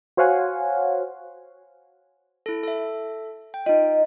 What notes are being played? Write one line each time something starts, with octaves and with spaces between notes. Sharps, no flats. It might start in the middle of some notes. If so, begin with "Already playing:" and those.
F#4 C5 C#5 F5 F#5 G#5
E4 A4
A4 E5
G5
D#4 F4 D#5